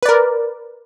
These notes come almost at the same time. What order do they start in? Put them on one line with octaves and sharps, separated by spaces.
B4 D5 A#4